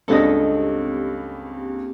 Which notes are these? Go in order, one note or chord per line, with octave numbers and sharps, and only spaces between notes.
C#2 G2 A#3 C4 G4 A4 D#5